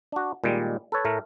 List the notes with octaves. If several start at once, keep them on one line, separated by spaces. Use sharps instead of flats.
D4 F#4
A#2 D#3 G3 G#3
A4 B4 C#5
A2 A3 A#4